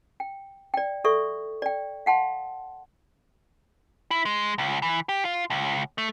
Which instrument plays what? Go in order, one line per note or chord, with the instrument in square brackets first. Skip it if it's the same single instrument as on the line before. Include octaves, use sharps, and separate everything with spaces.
[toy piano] G5
D5 G5
A4 D5 E5 C#6
D5 G5
F5 F#5 A5 C6
[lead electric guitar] E4
G#3
C#2
E3
G4
F4
C#2
A3